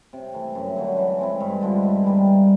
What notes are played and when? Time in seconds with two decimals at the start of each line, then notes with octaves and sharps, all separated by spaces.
0.13 C3
0.33 E3 A3
0.55 F#2
0.76 D3 F#3 A3
0.98 E3
1.19 G#3 C4 E4
1.40 G2
1.61 D3 F3 G#3
1.83 G2
2.04 E3 G3 A#3
2.26 A#3